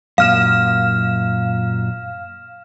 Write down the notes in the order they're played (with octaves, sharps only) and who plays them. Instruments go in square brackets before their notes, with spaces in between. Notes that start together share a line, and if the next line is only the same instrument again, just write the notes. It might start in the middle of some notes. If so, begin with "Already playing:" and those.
[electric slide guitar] F#2 A#2 [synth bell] F5 F6 E7